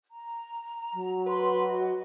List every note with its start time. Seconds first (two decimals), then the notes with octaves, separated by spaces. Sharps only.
0.12 A#5
0.93 F#3
1.27 B4 C6
1.67 F#4 D#5